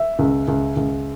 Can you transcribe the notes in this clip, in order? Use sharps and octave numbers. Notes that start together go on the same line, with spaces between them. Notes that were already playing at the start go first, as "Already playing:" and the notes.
Already playing: E5
C#2
C#2
C#2